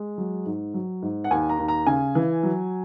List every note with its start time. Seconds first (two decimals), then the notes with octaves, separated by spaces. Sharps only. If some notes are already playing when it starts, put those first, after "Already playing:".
Already playing: G#3
0.18 F#3
0.46 G#2
0.74 F#3
1.02 G#2
1.24 F#5
1.31 D#2 G#5
1.49 A#5
1.59 D#2
1.68 A#5
1.87 C#3 G#5
2.15 E3
2.43 F#3